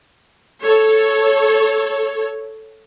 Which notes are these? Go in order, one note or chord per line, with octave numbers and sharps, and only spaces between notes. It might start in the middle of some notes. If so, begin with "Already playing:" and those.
A4 C#5